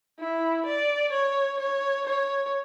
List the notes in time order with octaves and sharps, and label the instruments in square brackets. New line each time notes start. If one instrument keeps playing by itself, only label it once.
[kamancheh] E4
D5
C#5
C#5
C#5